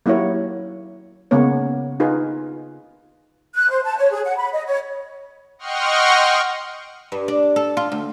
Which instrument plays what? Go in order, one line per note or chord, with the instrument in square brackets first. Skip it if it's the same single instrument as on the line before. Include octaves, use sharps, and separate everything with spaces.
[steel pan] F#3 A#3 E4 G4 C#5
C#3 G#3 A#3 B3 C#5
D#4 F4 G#4 B4
[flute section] F#6
C5
A5
C#5
G#4
F#5
B5
D#5
C#5
[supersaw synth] D#5 F#5 G5 C6 C#6 F6
[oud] G2
D4
A4
F4
D2